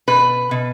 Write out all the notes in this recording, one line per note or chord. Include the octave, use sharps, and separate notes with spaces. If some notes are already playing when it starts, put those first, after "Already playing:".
B2 B4
B2